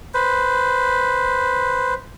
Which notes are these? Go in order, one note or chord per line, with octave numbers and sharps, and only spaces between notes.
B4 C5